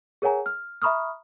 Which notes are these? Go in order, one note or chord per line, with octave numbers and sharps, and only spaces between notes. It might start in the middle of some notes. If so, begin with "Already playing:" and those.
G#4 A#4 C#5 F#5 G#5 A#5
F6
E5 A#5 B5 C#6 D#6 F6